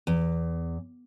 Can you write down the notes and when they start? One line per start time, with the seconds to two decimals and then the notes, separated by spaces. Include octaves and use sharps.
0.07 E2